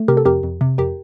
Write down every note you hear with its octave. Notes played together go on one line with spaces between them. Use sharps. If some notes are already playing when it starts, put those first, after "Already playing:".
Already playing: A3
C3 G4 A#4
A4
F2 G4 A#4
F2
C3
F2 G4 A#4